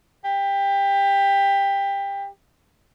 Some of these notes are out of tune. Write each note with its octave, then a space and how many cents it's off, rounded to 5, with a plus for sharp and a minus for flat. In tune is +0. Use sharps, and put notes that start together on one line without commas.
G4 +20